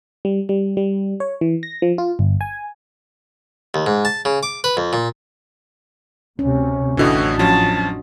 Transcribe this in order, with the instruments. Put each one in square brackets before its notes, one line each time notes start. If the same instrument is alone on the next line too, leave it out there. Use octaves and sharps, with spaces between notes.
[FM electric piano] G3
G3
G3
C#5
E3
A#6
F3
F4
G1
G#5
[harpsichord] D#2
G#2
A5
C#3
D6
B4
F2
A#2
[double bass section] D2 C3 [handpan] C#4
[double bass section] A1 F2 [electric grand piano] A2 D3 E3 [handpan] D4 F#4 D#5
[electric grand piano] F3 F#3 C#4 [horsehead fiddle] A5